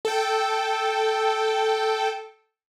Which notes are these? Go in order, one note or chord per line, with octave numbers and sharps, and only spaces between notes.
A4 G5